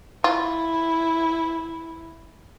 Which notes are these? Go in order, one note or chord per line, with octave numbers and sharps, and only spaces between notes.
E4 F4